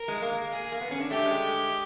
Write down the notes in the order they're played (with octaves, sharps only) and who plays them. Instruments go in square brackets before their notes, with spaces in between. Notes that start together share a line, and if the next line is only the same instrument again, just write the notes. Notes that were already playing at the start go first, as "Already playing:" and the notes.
Already playing: [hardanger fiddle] A#4
[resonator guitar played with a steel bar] G#3
A#3
[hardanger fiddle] G#4
[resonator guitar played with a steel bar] A#3
B3
C#4
D4
[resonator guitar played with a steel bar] A3 [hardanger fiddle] G4
[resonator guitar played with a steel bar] G#3